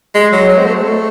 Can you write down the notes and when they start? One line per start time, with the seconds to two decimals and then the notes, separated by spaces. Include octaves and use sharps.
0.15 G#3
0.32 F#3
0.49 G#3
0.58 C4
0.67 A3
0.75 G#3
0.84 A3